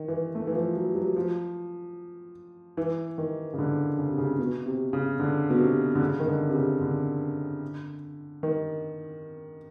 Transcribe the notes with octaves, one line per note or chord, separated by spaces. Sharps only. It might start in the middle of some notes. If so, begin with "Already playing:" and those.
Already playing: D#3
E3
A3
E3
F3
F#3
G3
F#3
F3
E3
D#3
C#3
D3
C#3
C3
C#3
B2
C3
C#3
D3
B2
C3
D3
C#3
D#3
D3
C3
C#3
D3
D#3